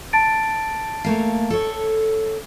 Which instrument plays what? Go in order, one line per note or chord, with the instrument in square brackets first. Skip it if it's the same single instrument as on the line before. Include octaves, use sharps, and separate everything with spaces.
[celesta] A5 A6 D7
[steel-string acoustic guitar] A3 A#3 F5
A4 C#5